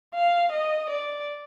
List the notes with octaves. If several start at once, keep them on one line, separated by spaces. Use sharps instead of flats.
F5
D#5
D5